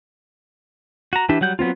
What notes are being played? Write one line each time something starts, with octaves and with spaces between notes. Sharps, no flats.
F#4 A#5
E3 D4 E4 G4 E5
F#3 G3 F#5 G6
F#3 B3 C4 F4